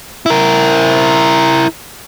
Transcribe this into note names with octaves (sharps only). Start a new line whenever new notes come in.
E4 A#4